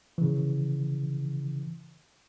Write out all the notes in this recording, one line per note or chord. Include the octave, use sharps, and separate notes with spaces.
C#3 E3